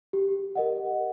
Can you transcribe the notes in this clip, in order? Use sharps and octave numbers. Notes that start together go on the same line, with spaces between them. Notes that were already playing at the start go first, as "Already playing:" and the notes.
G4
A#4 D#5 F#5